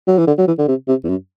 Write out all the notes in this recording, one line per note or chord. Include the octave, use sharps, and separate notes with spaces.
F#3
E3
D3
F#3
E3
D3
C3
C3
E2
F#2